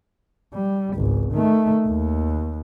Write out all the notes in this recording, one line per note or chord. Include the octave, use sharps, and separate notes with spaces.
G3
G#1 C#2
D#3 A3
D#2